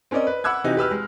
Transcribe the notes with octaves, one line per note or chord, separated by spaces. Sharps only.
C4 C#4 A#4 D5 D#5
B4
F#5 B5 D6 E6 F#6 G#6
C3 E3 D#4 F#4 G4
G4 B4 E6 F6
G#3